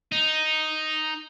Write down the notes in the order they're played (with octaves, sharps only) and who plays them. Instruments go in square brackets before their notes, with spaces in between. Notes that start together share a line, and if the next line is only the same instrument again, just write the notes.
[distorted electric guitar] D#4